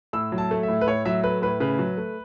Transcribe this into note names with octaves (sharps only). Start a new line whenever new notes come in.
A2 E6
F#3
A5
A3
E5
A2
B4
A2 C#5
F#3 E5
A3 B4
A2 B4
C#3 B4
F#3
A3